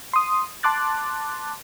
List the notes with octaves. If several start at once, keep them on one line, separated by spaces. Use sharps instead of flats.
C6 D#6
A5 C6 D6 F#6 A6